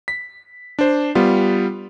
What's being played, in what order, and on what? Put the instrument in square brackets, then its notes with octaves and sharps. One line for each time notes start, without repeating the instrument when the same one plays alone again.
[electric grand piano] B6
D4 C5
G3 B3 F4